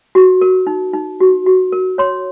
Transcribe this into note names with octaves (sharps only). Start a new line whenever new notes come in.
F#4
A#4
D#4
D#4
F#4
F#4
A#4
C#5 C6